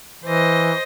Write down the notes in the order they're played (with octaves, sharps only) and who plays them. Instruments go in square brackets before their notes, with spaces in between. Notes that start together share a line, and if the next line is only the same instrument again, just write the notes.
[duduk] E3 [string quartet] C5 D#5